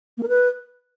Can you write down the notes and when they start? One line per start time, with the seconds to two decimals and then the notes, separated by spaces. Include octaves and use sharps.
0.18 A#3
0.23 A#4
0.28 B4